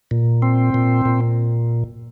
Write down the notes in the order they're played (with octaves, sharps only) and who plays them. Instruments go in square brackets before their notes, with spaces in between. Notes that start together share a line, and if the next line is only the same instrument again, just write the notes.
[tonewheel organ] A#2
C4
A#2
A#2